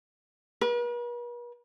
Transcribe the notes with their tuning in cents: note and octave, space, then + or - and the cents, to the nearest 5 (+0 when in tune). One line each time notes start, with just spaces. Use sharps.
B4 -45